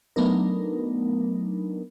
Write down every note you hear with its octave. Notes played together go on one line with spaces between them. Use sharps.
F#3 A3 B3 D4 D#4 A#4